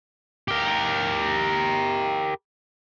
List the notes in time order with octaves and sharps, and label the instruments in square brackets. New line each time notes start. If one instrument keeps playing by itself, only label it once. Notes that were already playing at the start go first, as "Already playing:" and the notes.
[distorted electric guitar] G4 A#4